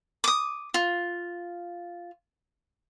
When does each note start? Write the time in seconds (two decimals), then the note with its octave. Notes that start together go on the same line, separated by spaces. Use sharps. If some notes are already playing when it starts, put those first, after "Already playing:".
0.24 D6 D#6
0.74 F4